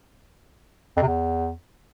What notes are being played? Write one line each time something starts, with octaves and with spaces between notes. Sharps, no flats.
F2
C3
E2